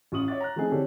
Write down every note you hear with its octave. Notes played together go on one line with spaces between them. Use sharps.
A1 F4 C#6 D#6 F#7
C#5 E5 D6 A6
A#5 F#6
F3 A3 C4 D#4 G#4
D3 E3 C4 G4 A4 C#5